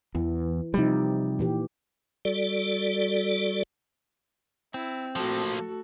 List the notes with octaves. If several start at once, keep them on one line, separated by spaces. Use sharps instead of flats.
E2 E3
C3 F3 G3 D#4
A#2 E3 G4
G3 F#4 A4 D5
C4 E4
F3 A3 A#3 F#4 A4